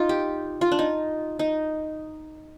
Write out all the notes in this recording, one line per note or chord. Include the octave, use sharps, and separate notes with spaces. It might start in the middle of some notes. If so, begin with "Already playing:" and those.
Already playing: D#4 F4
G4
F4
D4
D#4
D#4